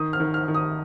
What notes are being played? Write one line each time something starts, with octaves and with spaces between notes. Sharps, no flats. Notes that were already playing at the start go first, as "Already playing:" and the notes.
Already playing: D#3 D#6
F6
D#3
F6
D#3
D#6